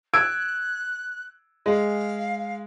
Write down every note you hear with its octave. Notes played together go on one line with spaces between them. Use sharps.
E6 F#6 G#6 D7
G#3 F5